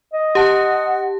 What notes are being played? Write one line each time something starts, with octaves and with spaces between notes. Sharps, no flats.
D#5
G4 F#5 A5